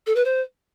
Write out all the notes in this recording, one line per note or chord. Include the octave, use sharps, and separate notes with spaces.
A4
B4
C5